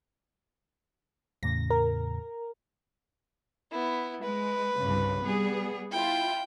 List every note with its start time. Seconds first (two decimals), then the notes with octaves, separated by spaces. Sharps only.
1.43 E2 A2 C#3 A#6
1.70 A#4
3.71 B3 E4
4.24 G#3 B4
4.80 C2 G2 C#3
5.25 G3 B3 G#4
5.92 E4 F4 G5